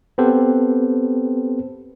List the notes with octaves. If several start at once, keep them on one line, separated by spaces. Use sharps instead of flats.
B3 C4 G4 A4 B4 C5